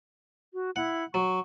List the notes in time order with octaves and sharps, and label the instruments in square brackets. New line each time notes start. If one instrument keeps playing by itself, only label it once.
[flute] F#4
[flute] E4 [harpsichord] F#5
[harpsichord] F#3 [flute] C#6